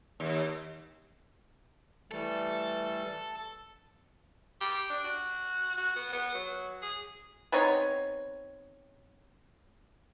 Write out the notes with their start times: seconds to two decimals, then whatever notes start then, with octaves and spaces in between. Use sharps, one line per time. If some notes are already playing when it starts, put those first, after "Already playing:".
0.20 D#2
2.11 E3 G3 A3 A4
4.61 G4
4.90 D4
5.04 F#4
5.77 F#4
5.96 B3
6.13 B3
6.35 F#3
6.82 G#4
7.52 B3 C4 D#4 C#5